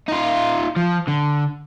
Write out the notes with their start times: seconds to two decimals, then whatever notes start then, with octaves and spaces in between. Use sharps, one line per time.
0.08 D#4 F4
0.76 F3
1.07 D3